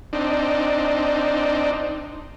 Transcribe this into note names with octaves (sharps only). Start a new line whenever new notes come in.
C4 D4 D#4